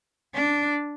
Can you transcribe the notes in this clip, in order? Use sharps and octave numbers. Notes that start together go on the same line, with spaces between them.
D4